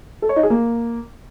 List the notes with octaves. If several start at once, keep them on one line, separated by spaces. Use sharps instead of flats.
A4
C#5
D#4
G#4
A#3